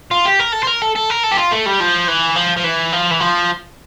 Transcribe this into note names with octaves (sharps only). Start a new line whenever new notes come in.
F4
G4
A#4
A4
C5
A#4
A4
A4
A#4
A4
G4
F4
A3
G3
F3
E3
F3
F3
E3
F3
E3
F3